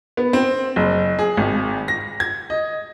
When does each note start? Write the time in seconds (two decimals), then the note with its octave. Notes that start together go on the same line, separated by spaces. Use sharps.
0.17 B3
0.33 C4
0.76 F#1
1.19 G#4
1.37 G#1
1.88 A#6
2.20 G#6
2.50 D#5